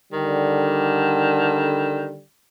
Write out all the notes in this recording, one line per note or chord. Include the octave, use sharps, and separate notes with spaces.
D3 D#3 G3